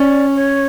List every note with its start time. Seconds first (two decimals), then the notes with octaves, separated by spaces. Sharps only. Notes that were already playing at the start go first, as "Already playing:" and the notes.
Already playing: C#4 D5
0.35 C#5